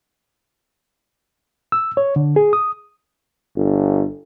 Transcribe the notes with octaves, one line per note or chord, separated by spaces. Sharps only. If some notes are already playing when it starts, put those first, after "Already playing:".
E6
C#5
D3
G#4
D#6
G1